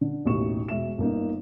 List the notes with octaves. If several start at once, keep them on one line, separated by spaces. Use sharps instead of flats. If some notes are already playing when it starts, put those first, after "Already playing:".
D3
A1 D#2 B2 D#4 C#6 E7
E1 E5 E7
G1 A#3 D#4